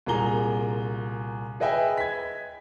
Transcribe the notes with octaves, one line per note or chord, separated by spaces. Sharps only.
C2 A#2 G#4 A#5 G7
G#4 B4 D#5 E5 G5 G#5
G#6 B6